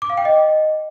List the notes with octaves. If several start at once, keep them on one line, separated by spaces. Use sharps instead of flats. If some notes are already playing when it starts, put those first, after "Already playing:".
D6
F5
G5
D#5